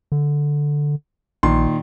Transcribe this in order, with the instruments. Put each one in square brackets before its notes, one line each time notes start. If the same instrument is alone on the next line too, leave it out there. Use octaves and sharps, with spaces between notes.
[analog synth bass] D3
[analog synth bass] A#1 [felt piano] A#2 D#3 C6